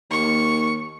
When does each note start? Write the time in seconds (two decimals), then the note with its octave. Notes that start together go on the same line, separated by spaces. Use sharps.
0.11 D#2 C#6